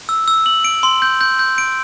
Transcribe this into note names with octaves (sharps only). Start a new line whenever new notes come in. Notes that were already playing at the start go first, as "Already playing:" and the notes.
E6
E6
F#7
D7
C6
G6
G6
G6
D7